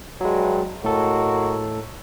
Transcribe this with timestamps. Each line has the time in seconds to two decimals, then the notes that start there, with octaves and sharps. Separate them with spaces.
0.21 G2 F#3 G#3
0.84 A2 G#3 A#3 F#4 A4